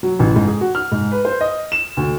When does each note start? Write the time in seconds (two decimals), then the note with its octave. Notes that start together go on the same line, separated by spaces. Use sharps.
0.03 F#3
0.19 A1
0.36 G#2
0.48 G#4
0.61 F#4
0.75 F6
0.92 G#2
1.12 B4
1.25 C5
1.41 D#5
1.72 E7
1.97 D2